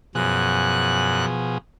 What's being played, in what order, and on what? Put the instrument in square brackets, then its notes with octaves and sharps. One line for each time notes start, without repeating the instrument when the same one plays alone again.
[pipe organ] F#2 F#6 [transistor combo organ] B2 F3 G#4